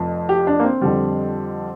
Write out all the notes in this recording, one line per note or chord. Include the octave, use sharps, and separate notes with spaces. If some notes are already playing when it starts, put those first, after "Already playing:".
Already playing: F1 F2 F3
G4
D4
A#3
C4
F2 D3 G3